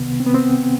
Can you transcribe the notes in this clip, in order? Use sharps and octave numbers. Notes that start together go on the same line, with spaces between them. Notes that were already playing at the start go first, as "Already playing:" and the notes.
Already playing: C2 C3 D#3 B3
C4
B3
C4